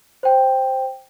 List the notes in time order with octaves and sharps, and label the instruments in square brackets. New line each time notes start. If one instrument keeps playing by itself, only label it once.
[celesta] C5 G5